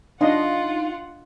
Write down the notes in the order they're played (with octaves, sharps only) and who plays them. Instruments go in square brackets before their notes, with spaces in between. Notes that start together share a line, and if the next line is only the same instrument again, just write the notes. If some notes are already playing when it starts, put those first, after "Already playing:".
[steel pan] D4 D#5 C6 [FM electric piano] D#4 F5 [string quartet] F4 F#5